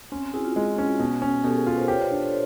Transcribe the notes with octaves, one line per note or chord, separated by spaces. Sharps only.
C4 C#4
C4
E4 F#4 G#4
F4
G#3
C#4
B2
C#4
B2 G4 A4
G#4 A#4
F4 A4 B4
A#4 C5
G4 B4 C#5
C5 D5
D4 B4 C#5
A4 B4